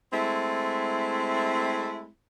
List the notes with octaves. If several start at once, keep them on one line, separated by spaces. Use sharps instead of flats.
G#3 A3 C4 E4